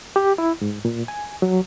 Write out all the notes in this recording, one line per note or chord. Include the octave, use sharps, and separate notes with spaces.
G4
E4
G#2
A#2
G#5
F#3